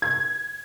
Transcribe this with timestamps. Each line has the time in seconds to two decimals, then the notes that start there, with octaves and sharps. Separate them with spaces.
0.02 G#6